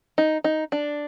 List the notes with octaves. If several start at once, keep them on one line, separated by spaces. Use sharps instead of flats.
D#4
D#4
D4